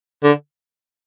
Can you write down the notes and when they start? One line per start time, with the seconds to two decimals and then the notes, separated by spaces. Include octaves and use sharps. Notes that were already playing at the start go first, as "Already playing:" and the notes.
0.24 D3